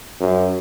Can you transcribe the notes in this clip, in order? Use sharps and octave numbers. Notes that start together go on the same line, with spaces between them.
F#2